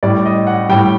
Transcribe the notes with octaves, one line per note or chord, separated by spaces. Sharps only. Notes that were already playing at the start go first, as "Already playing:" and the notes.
A2 G3 D5
D#5
F#5
A2 G3 G5